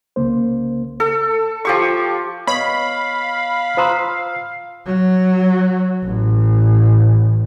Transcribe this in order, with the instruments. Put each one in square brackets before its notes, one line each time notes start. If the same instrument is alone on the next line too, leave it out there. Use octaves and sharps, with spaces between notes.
[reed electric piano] C2 C#3 A#3 C5
[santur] A4
F3 G4 C#6
[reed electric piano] B3 C#5 D#5 [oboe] F5 [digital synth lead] B5
[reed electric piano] F4 D#6 E6 [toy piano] C5 A#5 C6
[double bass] F#3
A1